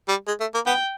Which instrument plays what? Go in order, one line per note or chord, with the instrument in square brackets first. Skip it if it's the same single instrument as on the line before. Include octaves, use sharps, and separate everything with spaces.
[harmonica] G3
G#3
A3
A#3
[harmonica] B3 [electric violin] G5